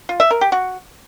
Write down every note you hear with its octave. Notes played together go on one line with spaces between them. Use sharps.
F4
E5
A#4
G4
F#4